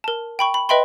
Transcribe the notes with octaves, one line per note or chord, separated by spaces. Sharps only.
A#4 A5
G5 B5 C#6
B5
B4 D#5 E5 G5 B5 C6